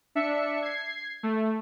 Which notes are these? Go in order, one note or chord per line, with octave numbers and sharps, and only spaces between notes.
D4 E5 C#7
G#6 C7
A3